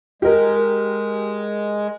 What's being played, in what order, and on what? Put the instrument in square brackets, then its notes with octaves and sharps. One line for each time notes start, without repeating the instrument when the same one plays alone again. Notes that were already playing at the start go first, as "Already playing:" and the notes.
[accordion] G#3 [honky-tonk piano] G4 A#4